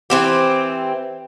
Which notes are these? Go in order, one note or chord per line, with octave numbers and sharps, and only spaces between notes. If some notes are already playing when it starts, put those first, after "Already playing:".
E3 C4 G4